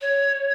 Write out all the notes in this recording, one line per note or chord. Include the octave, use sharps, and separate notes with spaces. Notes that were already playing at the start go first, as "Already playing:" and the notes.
C#5